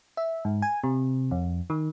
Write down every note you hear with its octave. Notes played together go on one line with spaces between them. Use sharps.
E5
G#2
G#5
C3
F2
D#3